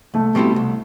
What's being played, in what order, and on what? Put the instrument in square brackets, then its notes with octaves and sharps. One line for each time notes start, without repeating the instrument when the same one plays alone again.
[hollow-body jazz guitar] C2 [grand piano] A3
[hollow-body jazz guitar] B2 G3 C4 E4
C2